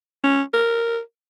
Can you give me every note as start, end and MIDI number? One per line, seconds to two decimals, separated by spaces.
0.24 0.42 61
0.53 1.00 70